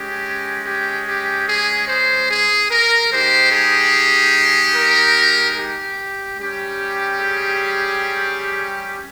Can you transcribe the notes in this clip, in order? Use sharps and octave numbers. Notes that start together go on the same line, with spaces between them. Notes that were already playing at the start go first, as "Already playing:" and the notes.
Already playing: G#3 C#4 G4
G4
G4
G#4
C5
G#4
A#4
G#3 D#4 G4 C5
G#4
A#4
G4
G3 C#4 G4
G#4